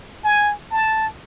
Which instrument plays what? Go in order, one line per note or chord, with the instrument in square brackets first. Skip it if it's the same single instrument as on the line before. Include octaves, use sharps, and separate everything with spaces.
[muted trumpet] G#5
A5